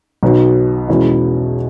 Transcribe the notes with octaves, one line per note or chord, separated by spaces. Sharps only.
B1 B2 F#3 B3
E2 B2 G#3 C#4 E4